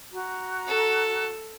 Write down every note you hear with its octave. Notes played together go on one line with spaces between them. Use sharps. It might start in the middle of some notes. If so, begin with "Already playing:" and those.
F#4 A#5
A4